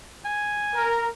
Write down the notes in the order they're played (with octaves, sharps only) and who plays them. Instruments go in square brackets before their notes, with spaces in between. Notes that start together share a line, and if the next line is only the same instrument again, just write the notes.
[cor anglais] G#5
[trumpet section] A#4